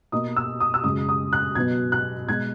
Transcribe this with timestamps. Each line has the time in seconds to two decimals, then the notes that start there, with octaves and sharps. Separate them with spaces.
0.12 B2 A#3 D#4 D#6
0.36 E6
0.60 D#6
0.74 E6
0.84 F#2 C#3 G#3 D#6
1.09 D#6
1.33 F#6
1.55 B2 F#3 B3 D#4 G#6
1.92 F#6
2.27 B2 G#3 D#4 G#6